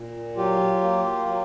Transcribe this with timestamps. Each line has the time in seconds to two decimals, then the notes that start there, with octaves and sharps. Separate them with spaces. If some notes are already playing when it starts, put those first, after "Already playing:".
Already playing: A#2
0.36 F#3 F4 G4
0.81 A#3
1.26 F#3